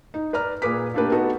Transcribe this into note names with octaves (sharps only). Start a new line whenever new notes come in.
D#4
B4 D5 A#5 F6
A#2 G#4 B4 D6 B6
A3 A#3 D4 G4 B4
B3 D#4 F#4 A4 B4